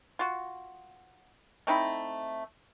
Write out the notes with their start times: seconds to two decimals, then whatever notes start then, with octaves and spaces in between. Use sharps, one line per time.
0.19 F4 F#4
1.67 A3 C4 D#4 E4